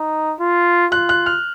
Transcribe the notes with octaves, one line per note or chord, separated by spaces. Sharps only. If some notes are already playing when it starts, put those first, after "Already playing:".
Already playing: D#4
F4
F4 F#6
F#6
F6